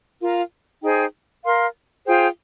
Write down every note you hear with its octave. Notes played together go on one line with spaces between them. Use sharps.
F4 A#4 F5
D#4 G#4 C5 G5
A#4 F5 C6
F4 G#4 C5 G5